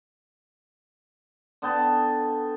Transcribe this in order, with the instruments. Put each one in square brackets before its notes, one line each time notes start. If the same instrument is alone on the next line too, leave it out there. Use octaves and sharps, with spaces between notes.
[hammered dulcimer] D3 B3 G5 A5